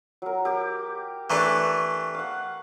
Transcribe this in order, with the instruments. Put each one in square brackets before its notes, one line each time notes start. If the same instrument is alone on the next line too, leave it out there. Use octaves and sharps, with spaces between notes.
[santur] F#3 A#4
[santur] G4 D6 [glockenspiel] E6
[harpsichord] E3 A3 D4 [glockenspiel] A#5 C#6 F#6
[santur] F5 F#5